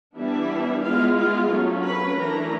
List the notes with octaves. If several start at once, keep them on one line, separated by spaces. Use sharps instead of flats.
E3 G3 B3 D4 E4 E5
G#3 B3 E4 F4 F5
F4 F5
F#3 A3 C#4
B4 B5
E3 A3 D4 A#4 A#5